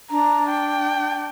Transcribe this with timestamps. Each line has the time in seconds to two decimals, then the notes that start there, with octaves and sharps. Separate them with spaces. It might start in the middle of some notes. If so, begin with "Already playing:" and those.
0.11 D4 A#5
0.50 G5